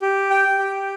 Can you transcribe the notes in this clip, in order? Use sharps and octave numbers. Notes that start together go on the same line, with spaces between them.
G4
G5
G4